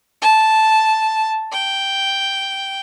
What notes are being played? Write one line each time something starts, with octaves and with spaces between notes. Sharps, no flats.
A5
G5